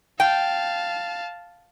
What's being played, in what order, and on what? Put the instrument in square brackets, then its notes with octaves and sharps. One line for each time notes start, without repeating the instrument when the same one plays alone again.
[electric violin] F5 A5 [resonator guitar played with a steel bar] G5